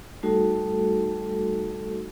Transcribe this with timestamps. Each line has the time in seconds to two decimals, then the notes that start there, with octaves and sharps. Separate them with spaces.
0.23 G3 A3 D#4 F#4 A4